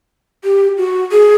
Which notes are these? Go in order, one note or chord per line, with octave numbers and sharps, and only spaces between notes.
G4
F#4
G#4